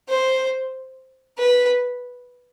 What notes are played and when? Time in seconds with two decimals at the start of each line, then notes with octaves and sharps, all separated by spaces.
0.09 C5
1.38 B4